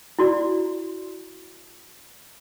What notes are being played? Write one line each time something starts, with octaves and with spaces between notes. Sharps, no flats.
E4 F#4 D5